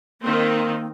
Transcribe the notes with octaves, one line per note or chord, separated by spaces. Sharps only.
D#3 A#3 C4